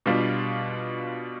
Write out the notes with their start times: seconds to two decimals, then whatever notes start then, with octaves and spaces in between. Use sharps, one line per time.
0.06 B2 G3 D4 F4